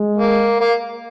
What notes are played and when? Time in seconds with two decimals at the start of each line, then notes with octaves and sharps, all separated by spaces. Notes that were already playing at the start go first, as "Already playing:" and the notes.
Already playing: G#3
0.17 A#3
0.60 A#3